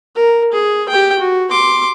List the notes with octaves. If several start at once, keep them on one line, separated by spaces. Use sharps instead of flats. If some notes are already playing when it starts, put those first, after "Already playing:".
A#4
G#4
G4 G5
F#4
C6 D6